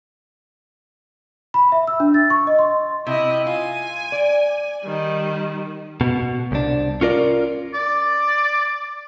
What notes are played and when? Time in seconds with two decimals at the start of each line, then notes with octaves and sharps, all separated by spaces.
1.54 B5
1.72 E5
1.87 E6
2.00 D4
2.14 A6
2.30 C#6
2.47 D#5
2.59 C6
3.07 C3 E4 D#5
3.47 F4 G#5
4.12 D5
4.84 D#3 G3
6.01 B2
6.52 C2 D4
7.01 C#4 F4 A#4 D5
7.74 D5